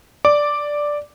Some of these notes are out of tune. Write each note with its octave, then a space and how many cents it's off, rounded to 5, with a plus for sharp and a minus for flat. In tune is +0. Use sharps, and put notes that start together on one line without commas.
D5 +0 D6 +0